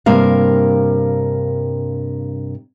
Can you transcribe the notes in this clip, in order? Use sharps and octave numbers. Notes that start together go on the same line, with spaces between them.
G2 C3 A#3 A#4 F5